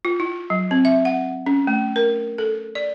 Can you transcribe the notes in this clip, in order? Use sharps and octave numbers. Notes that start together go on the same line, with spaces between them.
F4
E4
F#3
C4
E5
F#5
C#4
A3
A#4
A4
D5